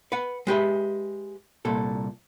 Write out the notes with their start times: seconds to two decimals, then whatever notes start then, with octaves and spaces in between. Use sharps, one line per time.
0.12 B4 F#5
0.47 G#3 G4 B4 E5
1.65 C2 A#2 A4